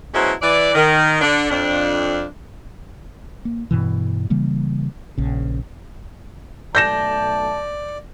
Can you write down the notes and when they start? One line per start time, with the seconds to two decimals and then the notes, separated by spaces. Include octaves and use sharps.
0.14 B2 F#3 G#3 C#4 E4 C5
0.42 E3 D5
0.74 D#3
1.21 D3 D4
1.51 F2 D4
3.45 A#3
3.71 G2 B2 E3
4.30 C#3 E3 G3 A#3
5.18 A#1 C#3
6.75 B1 A3 D5 A5 G6 A#6 E7